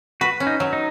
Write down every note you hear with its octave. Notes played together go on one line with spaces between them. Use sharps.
F#4 B4
C#4
D#4
F#3
D#4